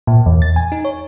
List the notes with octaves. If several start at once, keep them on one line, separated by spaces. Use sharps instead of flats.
A#2
E2
A6
G#5
D#4
C#5